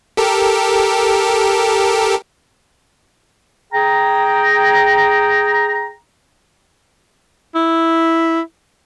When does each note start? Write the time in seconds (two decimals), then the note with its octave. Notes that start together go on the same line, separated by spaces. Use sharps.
0.17 G4 A4 A#4
3.73 G#4 G5 A#5
7.55 E4